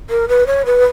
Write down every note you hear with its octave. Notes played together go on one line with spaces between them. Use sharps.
A#4
B4
C#5
B4